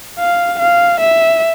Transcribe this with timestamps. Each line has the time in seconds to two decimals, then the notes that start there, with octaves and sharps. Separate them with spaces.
0.19 F5
0.59 F5
1.00 E5